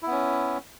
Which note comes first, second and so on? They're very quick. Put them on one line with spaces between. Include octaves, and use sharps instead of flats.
E4 B3 C#4